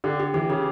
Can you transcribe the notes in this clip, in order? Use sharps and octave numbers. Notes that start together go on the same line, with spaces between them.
D3 G4
G4
E3 G4
C#3 G4